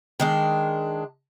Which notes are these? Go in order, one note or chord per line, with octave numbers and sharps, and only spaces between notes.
D#3 G#3 D4